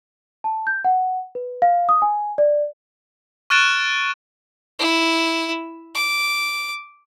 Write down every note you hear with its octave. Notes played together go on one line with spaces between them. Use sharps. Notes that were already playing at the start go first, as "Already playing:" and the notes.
A5
G6
F#5
B4
F5
D#6
G#5
D5
C#6 F6 F#6 A6 D7 E7
E4
D6